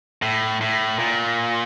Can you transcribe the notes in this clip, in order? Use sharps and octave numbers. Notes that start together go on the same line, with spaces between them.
A2
A2
A#2